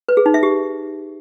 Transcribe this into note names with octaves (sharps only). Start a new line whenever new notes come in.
B4
G#4
D#4
E5
G4